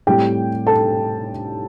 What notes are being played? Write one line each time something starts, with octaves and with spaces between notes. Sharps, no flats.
A2 G3 C4 G4 G5
A4 A5